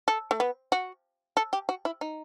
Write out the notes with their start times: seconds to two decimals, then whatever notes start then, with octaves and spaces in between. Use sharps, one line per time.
0.08 A4
0.31 A3
0.40 B3
0.72 F#4
1.37 A4
1.53 G4
1.69 F#4
1.85 E4
2.01 D#4